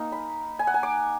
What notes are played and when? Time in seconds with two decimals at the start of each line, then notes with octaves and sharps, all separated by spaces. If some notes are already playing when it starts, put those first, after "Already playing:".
Already playing: A#3 D#4
0.12 B5
0.59 G#5
0.67 F#5
0.74 G#5
0.83 D6